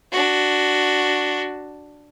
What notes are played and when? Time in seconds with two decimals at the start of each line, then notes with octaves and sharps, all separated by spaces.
0.12 D4 F#4